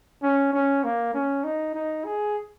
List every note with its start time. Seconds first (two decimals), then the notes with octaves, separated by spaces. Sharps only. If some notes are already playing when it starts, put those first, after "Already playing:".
0.23 C#4
0.53 C#4
0.84 A#3
1.14 C#4
1.44 D#4
1.75 D#4
2.05 G#4